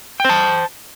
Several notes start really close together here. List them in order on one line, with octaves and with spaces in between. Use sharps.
G5 C5 A5